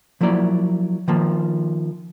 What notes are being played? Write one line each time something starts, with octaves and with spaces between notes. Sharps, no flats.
F3 F#3 A#3 E4 D5
D#3 F3 A#3